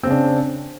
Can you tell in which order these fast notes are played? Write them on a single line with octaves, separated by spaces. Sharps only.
C4 C#3 D4